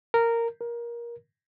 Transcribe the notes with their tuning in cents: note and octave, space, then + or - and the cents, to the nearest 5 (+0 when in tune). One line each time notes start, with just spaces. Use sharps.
A#4 -10
A#4 +20